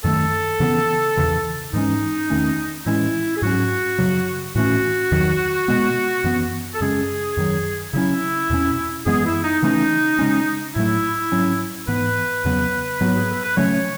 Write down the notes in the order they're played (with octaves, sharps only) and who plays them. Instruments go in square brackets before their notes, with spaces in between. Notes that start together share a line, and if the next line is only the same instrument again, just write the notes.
[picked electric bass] F#2 D#3 A3 [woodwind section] A4
[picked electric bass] C#3 E3 B3
E2 C#3 E3
[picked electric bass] G#2 E3 G#3 C#4 [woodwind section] D#4
[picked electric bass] E2 D#3 A3 C#4
[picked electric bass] A2 E3 G#3 C#4 [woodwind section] E4
[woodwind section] G#4
[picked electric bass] G#2 F#3 C#4 [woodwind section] F#4
[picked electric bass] F#2 C#3 F#3
[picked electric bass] A2 E3 A3 C#4 [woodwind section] F#4
[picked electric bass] E2 D#3 F#3
B2 G#3 B3
F#2 E3 B3
[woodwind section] A4
[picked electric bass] F#2 C#3 G#3 C#4 [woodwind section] G#4
[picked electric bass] F#2 D#3 F#3
[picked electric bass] C#3 F#3 C#4 [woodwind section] E4
[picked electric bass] E2 B2 A3 C#4
[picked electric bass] F#2 E3 G#3 B3 [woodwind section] G#4
[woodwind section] E4
D#4
[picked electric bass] C#3 E3 A3 C#4 [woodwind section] D#4
[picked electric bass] C#3 G#3 C#4
[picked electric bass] A2 F#3 A3 [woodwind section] E4
[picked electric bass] G#2 F#3 C#4
[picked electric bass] G#2 E3 B3 [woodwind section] B4
[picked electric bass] E2 C#3 F#3 B3
[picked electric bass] G#2 F#3 B3 [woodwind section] F#4
[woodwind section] G#4
A4
B4
[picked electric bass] C#3 F#3 A3 C#4 [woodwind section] C#5